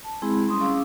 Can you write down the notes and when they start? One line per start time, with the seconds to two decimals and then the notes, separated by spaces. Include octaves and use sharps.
0.04 A5
0.22 G#3 C4 E4 G#4 B5
0.47 G3 A3 C#4 C6 C#6 D#6
0.60 C#4 G#4 F5 D6 E6